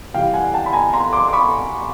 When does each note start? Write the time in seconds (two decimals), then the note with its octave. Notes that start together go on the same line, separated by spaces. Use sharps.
0.14 C3 E3 G3 F5 G5
0.34 F#5 G#5
0.54 G5 A5
0.66 B5
0.73 G#5 A#5
0.93 A#5 C6
1.13 C6 D6
1.28 D6
1.33 B5 C#6